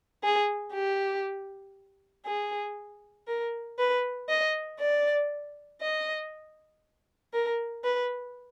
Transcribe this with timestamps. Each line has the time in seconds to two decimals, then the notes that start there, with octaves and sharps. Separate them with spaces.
0.24 G#4
0.73 G4
2.26 G#4
3.27 A#4
3.79 B4
4.29 D#5
4.79 D5
5.82 D#5
7.33 A#4
7.84 B4